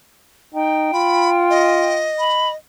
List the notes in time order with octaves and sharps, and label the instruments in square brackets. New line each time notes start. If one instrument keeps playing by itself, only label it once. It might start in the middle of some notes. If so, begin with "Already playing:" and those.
[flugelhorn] D#4 [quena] G5
[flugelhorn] F4 [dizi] B5
[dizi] D#5
[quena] B5